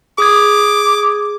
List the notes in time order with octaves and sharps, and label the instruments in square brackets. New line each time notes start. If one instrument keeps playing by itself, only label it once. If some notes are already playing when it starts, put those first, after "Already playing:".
[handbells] G#4 D#6 G#6 [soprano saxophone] D6